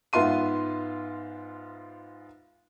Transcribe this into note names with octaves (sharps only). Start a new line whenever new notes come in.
G#2 B3 F4 E5 C6 D#7